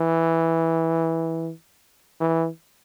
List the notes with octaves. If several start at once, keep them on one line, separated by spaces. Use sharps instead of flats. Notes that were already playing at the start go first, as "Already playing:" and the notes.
Already playing: E3
E3